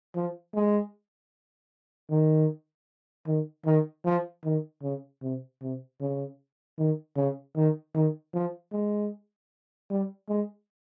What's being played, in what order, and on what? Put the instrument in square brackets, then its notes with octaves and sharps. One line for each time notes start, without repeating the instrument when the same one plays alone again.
[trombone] F3
G#3
D#3
D#3
D#3
F3
D#3
C#3
C3
C3
C#3
D#3
C#3
D#3
D#3
F3
G#3
G3
G#3